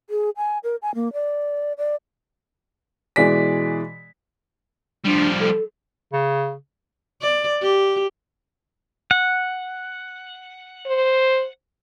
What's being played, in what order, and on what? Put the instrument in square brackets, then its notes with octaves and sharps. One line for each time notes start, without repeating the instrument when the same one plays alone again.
[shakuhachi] G#4
G#5
A#4
G#5
A#3
D5
D5
[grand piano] B2 E3 G#3 G#4 D5 B6
[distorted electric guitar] F3 G3 [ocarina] D4
[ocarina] A4
[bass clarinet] C#3
[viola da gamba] D5
G4
[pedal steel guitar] F#5
[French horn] C5